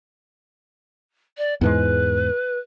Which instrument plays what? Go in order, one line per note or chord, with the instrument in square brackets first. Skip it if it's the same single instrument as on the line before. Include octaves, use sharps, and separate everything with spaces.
[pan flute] D5
[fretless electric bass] E2 G#2 G#3 [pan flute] B4